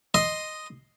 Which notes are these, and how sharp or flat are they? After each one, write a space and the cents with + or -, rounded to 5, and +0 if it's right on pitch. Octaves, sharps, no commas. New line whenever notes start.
D#5 +0 C6 +0